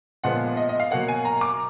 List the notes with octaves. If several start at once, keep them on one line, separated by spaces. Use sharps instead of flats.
A#2 F3 G#3 B3 F#5
D#5
D#5
F5
B2 F#3 A#3 F#5
G#5
A#5
D6